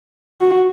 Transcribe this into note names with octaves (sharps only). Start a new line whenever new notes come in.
F#4